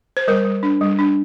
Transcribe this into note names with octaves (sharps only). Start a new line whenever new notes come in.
C5
G3 A#4
G3
D4
G3
D4